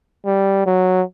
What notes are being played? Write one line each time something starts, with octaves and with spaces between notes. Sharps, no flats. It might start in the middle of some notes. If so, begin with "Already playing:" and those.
G3
F#3